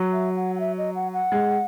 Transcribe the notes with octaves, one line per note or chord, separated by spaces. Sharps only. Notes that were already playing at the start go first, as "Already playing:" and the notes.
Already playing: F#3
E5
F#5
F#5
E5
D#5
F#5
F#5
G#3